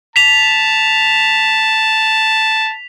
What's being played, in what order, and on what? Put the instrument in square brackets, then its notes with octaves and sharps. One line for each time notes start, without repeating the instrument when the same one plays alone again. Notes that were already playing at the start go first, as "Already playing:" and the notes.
[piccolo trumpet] A5 [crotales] B6 E7 F7